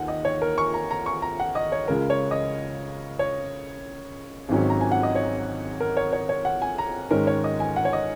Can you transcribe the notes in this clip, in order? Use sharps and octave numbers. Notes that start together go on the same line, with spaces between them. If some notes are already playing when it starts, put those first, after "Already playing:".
Already playing: D#2 D#3 F#5
D#5
C#5
A#4
C#6
A#5
A#5
C#6
A#5
F#5
D#5
C#5
C#2 C#3 G#3 A#4
C#5
D#5
C#5
G#1 G#2 D#3 F#3 C#4
A#5
G#5
F#5
D#5
C#5
A#4
C#5
C#5
C#5
F#5
G#5
A#5
G#2 D#3 G#3 C#4 A#4
C#5
D#5
G#5
F#5
C#5
D#5